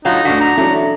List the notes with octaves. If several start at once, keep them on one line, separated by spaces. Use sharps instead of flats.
A2 F#3 D#4 F4
D2 G#2 D4 F#4 B6
A#5
E3 F#3 A3 D4